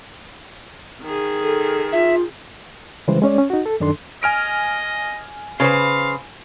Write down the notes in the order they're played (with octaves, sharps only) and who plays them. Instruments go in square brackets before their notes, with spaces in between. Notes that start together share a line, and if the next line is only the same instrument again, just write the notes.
[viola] D#3 G#4
[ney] A4
[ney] F4 [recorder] E5
[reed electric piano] C#3 E3 G3 G#3 B4 C5
G#3 C#4 C#5 D5
C#4
D#4 F#4
A4
F#2 D#3 D4 A4 C6
[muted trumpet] D#5 [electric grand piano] G#5 F6 D7
[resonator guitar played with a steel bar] C#3 B4 C5 [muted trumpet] F5